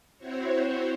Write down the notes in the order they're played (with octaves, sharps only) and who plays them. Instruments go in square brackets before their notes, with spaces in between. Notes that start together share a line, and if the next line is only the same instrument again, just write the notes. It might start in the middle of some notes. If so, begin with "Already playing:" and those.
[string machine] C4 E4 F#4 C5 C#5